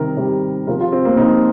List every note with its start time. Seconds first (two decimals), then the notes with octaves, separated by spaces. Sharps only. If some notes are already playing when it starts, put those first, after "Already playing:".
Already playing: C3 D#3 G3 A#4
0.17 C3 D#3 G3
0.67 C3 F3 A#4
0.80 F4
0.92 C4
1.05 A#3
1.17 C3 F3 D#4